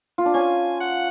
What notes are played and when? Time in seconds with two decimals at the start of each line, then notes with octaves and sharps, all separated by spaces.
0.18 F4
0.25 D4
0.34 C#4 G#5
0.80 F#5